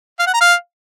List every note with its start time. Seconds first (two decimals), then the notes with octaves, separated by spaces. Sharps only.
0.19 F5
0.26 F#5
0.34 A#5
0.41 F5